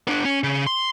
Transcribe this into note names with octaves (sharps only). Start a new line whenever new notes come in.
B3 D4
C#4
C#3
C6